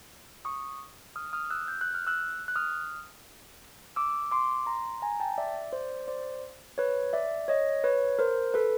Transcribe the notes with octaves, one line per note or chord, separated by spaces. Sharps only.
C#6 D#6
D#6 F6
D#6 F6
E6 F#6
G6
F#6
F6
E6 F#6
F#6
D#6 F6
D6 E6
C6 D6
A#5 C6
G#5 A#5
G5 A5
D5 E5
C5 D5
C5 D5
B4 C#5
D5 E5
C#5 D#5
B4 C#5
A#4 C5
A4 B4